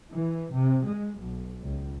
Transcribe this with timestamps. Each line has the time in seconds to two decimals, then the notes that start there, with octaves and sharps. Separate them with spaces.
0.11 E3
0.52 C3
0.88 G#3
1.18 B1
1.63 C#2